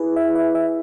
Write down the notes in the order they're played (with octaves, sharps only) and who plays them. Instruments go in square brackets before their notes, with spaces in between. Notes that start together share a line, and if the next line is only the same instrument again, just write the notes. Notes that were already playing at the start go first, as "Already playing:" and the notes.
Already playing: [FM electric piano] E4 G#4 B4
E5
E5
E5